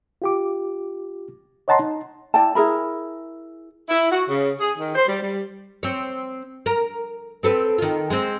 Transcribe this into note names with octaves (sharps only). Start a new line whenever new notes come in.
F4 G4 D6
C#5 D#5 F#5 A5 A#5 C6
D#4
E4 D5 G5 A5
E4 G#4 A#4 B5
E4
F#4
C#3
G#4
D#3
C5
G3
G3
C4 C#5
A#4
C4 A4 B4
D#3 F4
G#3 C4